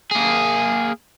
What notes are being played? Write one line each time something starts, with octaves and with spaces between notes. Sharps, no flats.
A#3 G#4